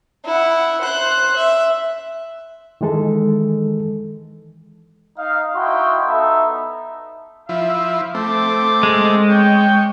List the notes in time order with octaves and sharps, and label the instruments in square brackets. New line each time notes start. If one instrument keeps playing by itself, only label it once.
[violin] E4 F#5
C5 F#6
E5
[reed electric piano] D#3 E3 G#3 A4
[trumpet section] D#4 D#5 F5
D#4 E4 F#4 F5 G5 C6
B3 D#4 A4 E5
[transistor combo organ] F3 E4 [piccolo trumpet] E5
[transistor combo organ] A3 C4 [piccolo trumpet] D6
[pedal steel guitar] G#3
[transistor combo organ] C#5 [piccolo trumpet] G5